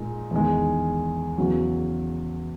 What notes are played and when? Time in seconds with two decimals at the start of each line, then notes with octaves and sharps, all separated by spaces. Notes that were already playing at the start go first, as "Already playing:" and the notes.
Already playing: A#2 G#3 D#4
0.31 E2 D#3 G#3
1.38 E2 C#3 F#3